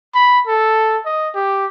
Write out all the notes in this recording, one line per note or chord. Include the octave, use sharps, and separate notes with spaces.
B5
A4
D#5
G4